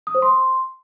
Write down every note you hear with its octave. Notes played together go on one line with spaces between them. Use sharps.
D#6
C5
C6